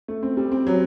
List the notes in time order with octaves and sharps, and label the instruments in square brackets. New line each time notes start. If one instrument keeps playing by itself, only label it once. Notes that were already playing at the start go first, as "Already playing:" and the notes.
[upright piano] A3
C4
G3
C4
F#3